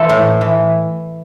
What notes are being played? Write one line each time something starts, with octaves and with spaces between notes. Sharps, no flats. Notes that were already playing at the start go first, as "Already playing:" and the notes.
Already playing: E3 A4 C5
A2
E3